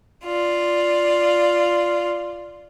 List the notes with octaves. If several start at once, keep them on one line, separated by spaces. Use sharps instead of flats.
F4 D5